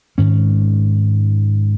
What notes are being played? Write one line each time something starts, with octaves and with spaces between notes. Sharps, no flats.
G#2 D#3 G#3 C#4